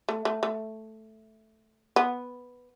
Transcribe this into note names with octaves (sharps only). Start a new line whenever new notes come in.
A3
A3
A3
B3